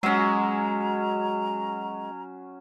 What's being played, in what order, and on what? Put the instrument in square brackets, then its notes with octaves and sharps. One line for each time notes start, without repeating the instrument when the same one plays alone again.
[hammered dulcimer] F#3 C#4 [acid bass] G#3 [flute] A#5